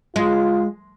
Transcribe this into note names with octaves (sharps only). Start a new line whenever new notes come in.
G#3 F4